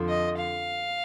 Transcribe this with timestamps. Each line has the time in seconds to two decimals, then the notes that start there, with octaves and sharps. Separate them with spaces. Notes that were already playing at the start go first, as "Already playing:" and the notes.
Already playing: F2 D3 F3
0.09 D#5
0.38 F5